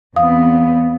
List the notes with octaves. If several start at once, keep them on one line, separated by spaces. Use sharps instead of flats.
E2 B3 C4 F5 D#6